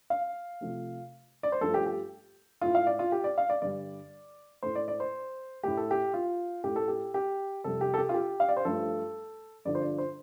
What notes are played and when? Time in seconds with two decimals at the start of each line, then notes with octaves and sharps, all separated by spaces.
0.10 F5
0.61 C3 F3 A3
1.43 D5
1.52 C5
1.61 G2 F3 A3 A4
1.74 G4
1.86 G4
2.61 A2 A3 F4
2.75 F5
2.87 D5
2.99 F4
3.12 G4
3.24 D5
3.38 F5
3.50 D5
3.62 G2 D3 G3 D5
4.63 A2 A3 C5
4.75 D5
4.88 D5
5.00 C5
5.63 A2 A3 G4
5.77 A4
5.91 G4
6.14 F4
6.64 A2 A3 G4
6.76 A4
6.88 G4
7.14 G4
7.64 F2 C3 G3 A4
7.81 G4
7.94 A4
7.98 G4
8.09 F4
8.14 G4
8.40 F5
8.49 D5
8.57 C5
8.65 G2 F3 A3 A4
9.65 G2 D3 F3 D5
9.75 C5
9.82 D5
9.98 C5